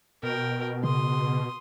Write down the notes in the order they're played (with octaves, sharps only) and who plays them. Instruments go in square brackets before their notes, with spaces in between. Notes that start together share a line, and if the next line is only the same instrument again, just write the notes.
[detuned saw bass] B2 [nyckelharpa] A#4 G5
[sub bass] C#3 [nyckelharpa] C6 D#6